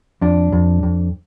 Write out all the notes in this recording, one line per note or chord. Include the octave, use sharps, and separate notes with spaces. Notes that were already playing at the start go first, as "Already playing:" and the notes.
F2 D4
F2
F2